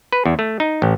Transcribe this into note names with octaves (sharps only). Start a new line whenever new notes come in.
B4
E2
A3
D#4
A1